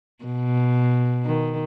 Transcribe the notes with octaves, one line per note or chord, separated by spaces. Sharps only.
B2
D#3